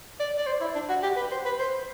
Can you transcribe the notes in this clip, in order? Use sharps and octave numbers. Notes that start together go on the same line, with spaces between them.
D5
D5
C5
E4
D4
F#4
G4
B4
C5
B4
C5